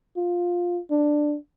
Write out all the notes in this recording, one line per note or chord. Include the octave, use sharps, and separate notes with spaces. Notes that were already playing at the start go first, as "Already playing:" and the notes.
F4
D4